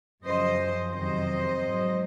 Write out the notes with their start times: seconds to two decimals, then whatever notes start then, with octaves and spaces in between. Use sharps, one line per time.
0.23 F#2 C#3 F3 C5 D#5
0.91 F2 C3 D#3 F#3 C5 D#5
1.60 G#2 F#3